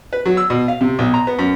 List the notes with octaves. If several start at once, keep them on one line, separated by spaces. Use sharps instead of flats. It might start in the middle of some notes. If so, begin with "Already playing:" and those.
B4
F#3
E6
B2
F5
C3
B1
A#5
B3
F#2